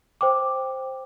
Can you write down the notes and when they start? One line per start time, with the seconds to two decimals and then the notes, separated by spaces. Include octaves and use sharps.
0.21 C5 G5 D6